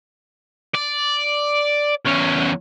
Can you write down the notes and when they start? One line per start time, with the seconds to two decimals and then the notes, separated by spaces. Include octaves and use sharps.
0.74 D5
2.05 E2 C#4